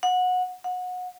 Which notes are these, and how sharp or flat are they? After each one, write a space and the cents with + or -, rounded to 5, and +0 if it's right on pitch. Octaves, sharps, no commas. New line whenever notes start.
F#5 -20
F#5 -25